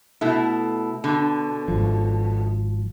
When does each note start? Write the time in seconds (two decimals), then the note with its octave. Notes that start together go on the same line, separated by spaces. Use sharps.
0.21 B2 A3 E4
1.04 B2 D3
1.68 G#1 F3